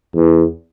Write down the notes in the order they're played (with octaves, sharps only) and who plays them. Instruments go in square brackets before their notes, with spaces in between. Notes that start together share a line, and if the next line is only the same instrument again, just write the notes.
[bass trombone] E2